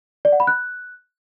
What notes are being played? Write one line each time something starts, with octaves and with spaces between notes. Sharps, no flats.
D5
F#5
B5
F#6